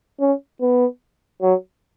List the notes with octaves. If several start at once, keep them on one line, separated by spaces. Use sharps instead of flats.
C#4
B3
F#3